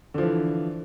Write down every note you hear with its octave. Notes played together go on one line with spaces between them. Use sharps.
D3 E3 F3